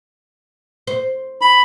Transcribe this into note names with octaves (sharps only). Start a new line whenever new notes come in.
C5
B5